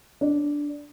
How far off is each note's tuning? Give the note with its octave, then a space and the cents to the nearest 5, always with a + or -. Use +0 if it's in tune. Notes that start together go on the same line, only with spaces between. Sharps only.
D4 -5